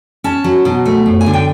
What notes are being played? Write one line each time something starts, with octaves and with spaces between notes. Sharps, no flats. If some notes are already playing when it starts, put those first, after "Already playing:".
C#4 A5
F#3
B2
A3
F#2
G#5
D3
G5